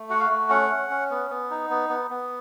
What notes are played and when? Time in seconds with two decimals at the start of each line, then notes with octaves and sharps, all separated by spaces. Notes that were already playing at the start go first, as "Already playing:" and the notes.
Already playing: A3
0.10 F#4 F#5
0.20 F5
0.30 A3
0.49 C#4 F#5
0.70 C#4
0.90 C#4
1.10 B3
1.30 B3
1.50 D#4
1.70 B3
1.89 B3
2.11 B3